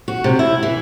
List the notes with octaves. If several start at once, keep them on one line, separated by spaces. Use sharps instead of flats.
F#4
C3
E4
E3